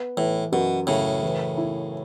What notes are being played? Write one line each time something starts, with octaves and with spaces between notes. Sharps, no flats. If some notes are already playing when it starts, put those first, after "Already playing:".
Already playing: B3
A2 E3
F#2 B2
F#2 A2 C#3
E3
E4